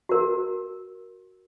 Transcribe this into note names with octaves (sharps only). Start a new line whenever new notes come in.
F#4 A#4